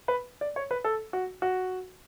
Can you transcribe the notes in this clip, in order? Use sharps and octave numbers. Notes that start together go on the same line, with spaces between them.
B4
D5
C#5
B4
A4
F#4
F#4